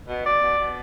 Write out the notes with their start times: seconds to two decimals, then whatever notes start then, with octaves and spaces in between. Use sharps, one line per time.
0.08 B2
0.25 B2 D5
0.42 B2
0.59 B2